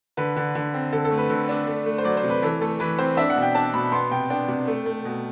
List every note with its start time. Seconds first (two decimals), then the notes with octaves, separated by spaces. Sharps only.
0.17 D3 B4
0.36 D3
0.55 D3
0.74 C4
0.92 D3 A4
1.05 A4
1.11 A3
1.18 B4
1.30 D3
1.49 D4
1.67 A3
1.86 A3
1.98 C5
2.05 F#3 D5
2.17 C5
2.23 C3
2.30 B4
2.42 E3 A4
2.61 A3 A4
2.80 E3 B4
2.99 C4 C5
3.17 D4 E5
3.30 F#5
3.36 B2
3.42 G5
3.55 D4 A5
3.74 B2 B5
3.92 B3 C6
4.11 C3 G5
4.30 D4 G5
4.48 C3
4.67 A3
4.86 A3
5.05 B2